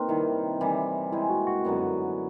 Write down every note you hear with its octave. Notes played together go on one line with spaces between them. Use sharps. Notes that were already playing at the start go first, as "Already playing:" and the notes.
Already playing: A#3 C4 D#4 A#4 B4
C3 D#3 G3 E4
C3 E3 G3
G#3 C4 D#4 E4 G#4
F#4
F#4
F#2 D3 F#3 B3